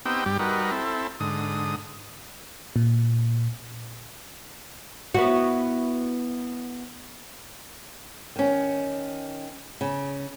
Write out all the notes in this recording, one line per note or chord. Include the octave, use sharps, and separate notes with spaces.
B3 C4 D#4 G4 G5 E6
G2 G3 G4
G3 D#4 F#4 A#4 B4
C4 E4 A4
G#2 D3 D#6
A#2
B3 E4 F#4
D#3 C#4
C#3